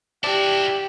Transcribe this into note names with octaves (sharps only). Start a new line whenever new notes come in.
D4 E4 F#4 G4